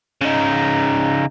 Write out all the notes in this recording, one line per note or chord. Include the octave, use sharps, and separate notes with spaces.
C#3 D#4